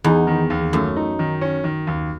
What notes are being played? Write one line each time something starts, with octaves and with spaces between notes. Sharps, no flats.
E2 D#4
D#3
D#2
F#2 A3
D#4
D#3
C#4
D#3
D#2